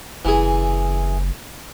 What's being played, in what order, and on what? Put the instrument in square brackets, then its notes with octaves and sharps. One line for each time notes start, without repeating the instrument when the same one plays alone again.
[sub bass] F#1 [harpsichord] E3 G#4